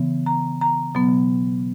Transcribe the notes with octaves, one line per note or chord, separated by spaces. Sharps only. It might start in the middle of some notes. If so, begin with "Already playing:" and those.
Already playing: C#3 E3 B3
A#5
A#5
B2 F#3 B3